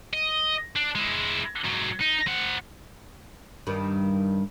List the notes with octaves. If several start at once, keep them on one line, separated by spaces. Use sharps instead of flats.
D#5
D4
G#3 E4
G#2 F#3
D#4
C4 F#5
G2 D#3